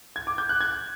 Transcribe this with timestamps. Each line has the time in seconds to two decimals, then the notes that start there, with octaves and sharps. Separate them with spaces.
0.16 G#6
0.27 D6
0.38 G6
0.49 F#6
0.61 G#6